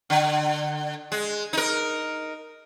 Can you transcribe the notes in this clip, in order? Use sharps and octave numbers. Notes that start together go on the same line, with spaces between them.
D3
G#3
D#4 A#4